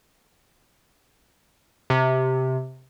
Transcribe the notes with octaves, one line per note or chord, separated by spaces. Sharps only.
C3